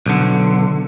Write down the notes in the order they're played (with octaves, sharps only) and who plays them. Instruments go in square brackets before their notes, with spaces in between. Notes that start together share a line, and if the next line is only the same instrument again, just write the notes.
[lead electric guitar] B1 D3